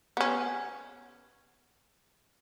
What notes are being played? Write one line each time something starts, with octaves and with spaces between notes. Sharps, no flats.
B3 C#4